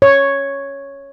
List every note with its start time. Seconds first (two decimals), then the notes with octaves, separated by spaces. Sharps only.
0.02 C#5